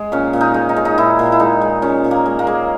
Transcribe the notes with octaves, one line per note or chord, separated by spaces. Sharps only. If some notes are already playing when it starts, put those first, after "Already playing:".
Already playing: G#3
A#2 C#4
A#2
D#4
G#3
D#4
G#3
D#4
A#2 E4
A#2
E4
G#3 D#4
G#3
A#2 C#4
A#2
A#3
G#3
A#3
G#3